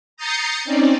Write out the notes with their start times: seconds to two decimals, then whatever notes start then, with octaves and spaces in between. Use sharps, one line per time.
0.17 A#5 D#6 G6 A6 C7 C#7
0.65 C4 C#4 D#4 D5